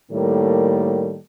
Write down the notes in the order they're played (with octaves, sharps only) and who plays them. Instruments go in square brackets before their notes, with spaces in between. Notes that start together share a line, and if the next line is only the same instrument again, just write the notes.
[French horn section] A2 D#3 G3 A#3 A4